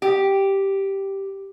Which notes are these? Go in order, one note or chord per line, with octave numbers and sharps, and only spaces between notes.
G4